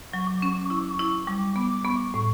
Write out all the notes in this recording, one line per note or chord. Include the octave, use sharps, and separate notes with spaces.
F#3 C#6
D6
C#4 C#6
D6
E4 C#6
D6
C#6
E4
G3 D6
B3 D6
B3 C#6
A2